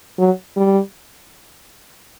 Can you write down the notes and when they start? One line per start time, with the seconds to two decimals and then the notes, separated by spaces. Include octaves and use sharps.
0.19 F#3
0.56 G3